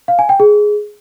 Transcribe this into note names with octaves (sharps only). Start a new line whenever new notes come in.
F5
G#5
G5
G#4